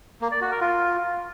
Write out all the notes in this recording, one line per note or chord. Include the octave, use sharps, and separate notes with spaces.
A#3
D5
F#4
A#4
F4